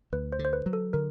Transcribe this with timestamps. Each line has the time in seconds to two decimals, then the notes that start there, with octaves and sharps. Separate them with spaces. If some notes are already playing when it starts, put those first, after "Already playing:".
0.13 D2 B4
0.32 C5
0.39 D3
0.45 C5
0.53 B4
0.66 F#3
0.73 A4
0.93 D3 A#4